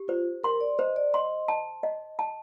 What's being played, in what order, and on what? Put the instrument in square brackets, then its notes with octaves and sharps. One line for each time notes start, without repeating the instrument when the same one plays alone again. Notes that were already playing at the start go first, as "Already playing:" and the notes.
Already playing: [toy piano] G4
[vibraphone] F4 [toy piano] C5
[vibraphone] A#4 [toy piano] C6
[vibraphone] D5
[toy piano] C5 [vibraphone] D#5
[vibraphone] D5
[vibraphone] D#5 [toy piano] C6
[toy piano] A5
D#5
A5